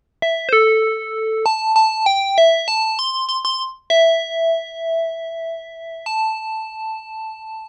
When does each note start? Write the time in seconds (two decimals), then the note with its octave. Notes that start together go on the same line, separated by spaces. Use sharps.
0.22 E5
0.49 C5
0.53 A4
1.46 A5
1.76 A5
2.06 G5
2.38 E5
2.68 A5
2.99 C6
3.29 C6
3.45 C6
3.90 E5
6.06 A5